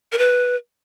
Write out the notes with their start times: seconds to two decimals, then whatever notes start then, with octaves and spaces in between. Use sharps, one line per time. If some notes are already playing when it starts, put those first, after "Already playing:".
0.12 A#4
0.18 B4